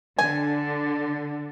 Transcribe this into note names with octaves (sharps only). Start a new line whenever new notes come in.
D3 G#5